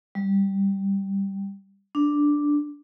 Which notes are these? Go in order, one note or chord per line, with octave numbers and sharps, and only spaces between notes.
G3
D4